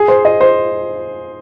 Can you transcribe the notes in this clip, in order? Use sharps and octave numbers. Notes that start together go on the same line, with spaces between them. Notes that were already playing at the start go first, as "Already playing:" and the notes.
Already playing: G#4
C5
D#5
C5